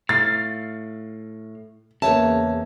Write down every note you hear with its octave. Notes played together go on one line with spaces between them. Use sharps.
A2 F5 A6
E2 C#3 A#3 C#5 E5 A5